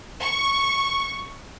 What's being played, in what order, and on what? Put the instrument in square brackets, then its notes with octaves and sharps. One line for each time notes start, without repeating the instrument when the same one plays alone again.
[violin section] C#6